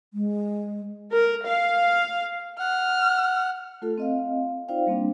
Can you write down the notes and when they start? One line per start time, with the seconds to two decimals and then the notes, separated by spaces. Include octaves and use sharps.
0.14 G#3
1.11 A#4
1.46 F5
2.59 F#5 F6
3.82 A3 F4 A4
3.98 C4 D#5 F5
4.68 D#4 F4 C5 D5 F5 G5
4.87 G3 A#3 C4 D4